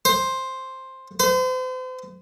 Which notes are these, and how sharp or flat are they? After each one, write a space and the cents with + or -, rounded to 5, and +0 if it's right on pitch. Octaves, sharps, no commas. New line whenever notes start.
C5 +5
C5 -40